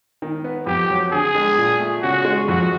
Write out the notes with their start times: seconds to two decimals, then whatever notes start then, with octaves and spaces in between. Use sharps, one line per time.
0.22 D#3
0.44 B3
0.67 F2 G4
0.90 F#3
1.12 D3 G#4
1.35 G#3
1.58 A#2
1.80 A3
2.02 C#3 F#4
2.25 G#3
2.48 F2 F#4